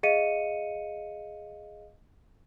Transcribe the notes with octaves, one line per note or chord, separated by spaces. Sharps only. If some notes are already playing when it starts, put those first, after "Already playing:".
G#4 D#5 F5 C#7 D#7